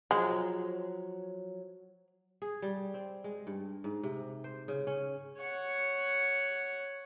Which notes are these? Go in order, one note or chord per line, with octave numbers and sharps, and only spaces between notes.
F3 F#3 G#3 C#5
G#4
G3
C4
G#3
G2
G#2
C3
C5
C#3
C#4
C#5 F#5